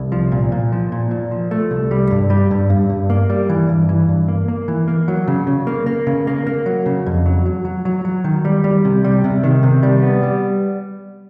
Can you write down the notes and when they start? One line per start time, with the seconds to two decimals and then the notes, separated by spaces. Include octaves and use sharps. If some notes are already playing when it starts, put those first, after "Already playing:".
Already playing: C2
0.12 F3
0.32 A#2
0.52 A#2
0.72 F3
0.92 A#2
1.11 A#2
1.31 F3
1.51 A3
1.71 C2
1.91 G3
2.11 G2
2.30 G3
2.51 G2
2.70 G2
2.90 G2
3.10 A#3
3.30 G3
3.49 E3
3.69 G2
3.89 E3
4.08 G2
4.28 A#3
4.48 A#3
4.68 E3
4.88 A#3
5.08 F#3
5.28 C#3
5.47 C#3
5.67 A#3
5.86 A#3
6.07 C#3
6.27 A#3
6.47 A#3
6.66 F#3
6.86 C#3
7.06 F2
7.26 F#3
7.46 F#3
7.65 F#3
7.85 F#3
8.05 F#3
8.24 D#3
8.45 G3
8.64 G3
8.85 C3
9.04 G3
9.24 C3
9.43 D#3
9.63 C3
9.83 G3
10.02 B3
10.23 G3